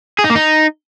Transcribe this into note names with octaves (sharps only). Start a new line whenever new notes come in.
G#4
D#4
A#3
D#4